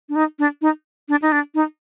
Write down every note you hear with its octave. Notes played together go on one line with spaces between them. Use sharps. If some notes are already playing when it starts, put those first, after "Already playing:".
D4
D#4
D4
D#4
D4
D#4
D4
D#4